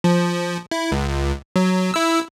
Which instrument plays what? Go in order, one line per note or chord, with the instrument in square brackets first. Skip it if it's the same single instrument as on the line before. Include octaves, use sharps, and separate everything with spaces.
[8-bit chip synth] F3
E4
C#2
F#3
E4 E6